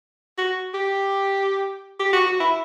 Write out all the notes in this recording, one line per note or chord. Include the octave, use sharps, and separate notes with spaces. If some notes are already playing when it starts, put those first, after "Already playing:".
F#4
G4
G4
F#4
F#4
E4